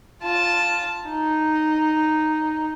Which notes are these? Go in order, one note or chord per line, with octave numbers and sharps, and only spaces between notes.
F4 A5
D#4